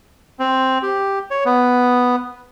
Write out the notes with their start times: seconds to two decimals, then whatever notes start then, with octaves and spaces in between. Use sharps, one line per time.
0.39 C4
0.83 G4
1.31 C#5
1.45 B3